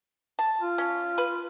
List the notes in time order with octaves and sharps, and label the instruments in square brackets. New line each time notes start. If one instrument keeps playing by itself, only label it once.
[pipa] A5
[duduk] F4
[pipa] C#4
B4